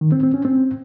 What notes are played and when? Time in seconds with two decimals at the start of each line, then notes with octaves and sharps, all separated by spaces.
0.01 D#3
0.12 C4
0.23 C4
0.34 C#4
0.45 C4